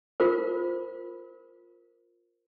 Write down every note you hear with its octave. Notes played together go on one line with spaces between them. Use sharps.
F4 A#4 C5